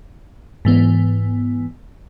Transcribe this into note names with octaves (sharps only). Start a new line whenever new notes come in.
G#2 E3 B3